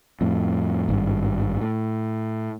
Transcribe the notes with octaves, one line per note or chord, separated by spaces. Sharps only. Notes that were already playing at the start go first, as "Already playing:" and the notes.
F2 A2
G#1 G2
A2